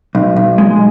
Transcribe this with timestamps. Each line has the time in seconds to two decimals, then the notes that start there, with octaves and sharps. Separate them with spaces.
0.15 B1
0.36 B1
0.58 G#3